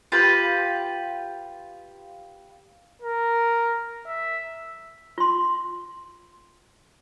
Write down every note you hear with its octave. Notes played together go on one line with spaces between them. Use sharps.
F4 G4 B4
A#4
E5
F4 C6